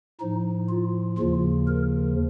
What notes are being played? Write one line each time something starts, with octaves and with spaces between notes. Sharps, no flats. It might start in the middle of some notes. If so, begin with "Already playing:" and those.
A2 F3 D#4
F4
D#2 C#3 F3 F4
A#4